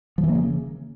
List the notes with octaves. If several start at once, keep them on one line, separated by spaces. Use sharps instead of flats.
F3
E3
A#3
C#3